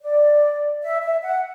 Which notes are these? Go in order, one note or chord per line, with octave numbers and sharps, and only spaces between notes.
D5
E5
E5
F#5